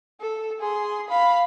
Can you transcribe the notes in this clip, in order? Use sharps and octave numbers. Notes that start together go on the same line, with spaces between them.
A4
G#4 C6
F5 B5